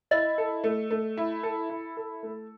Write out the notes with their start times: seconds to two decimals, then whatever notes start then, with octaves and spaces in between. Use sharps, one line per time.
0.11 E4 D#5
0.38 A4
0.64 A3
0.91 A3
1.17 E4
1.43 A4
1.70 E4
1.97 A4
2.23 A3